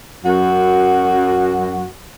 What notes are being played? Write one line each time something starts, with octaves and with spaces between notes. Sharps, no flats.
F#2 F#4